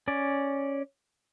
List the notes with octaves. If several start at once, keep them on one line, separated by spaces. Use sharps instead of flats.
C#4 D5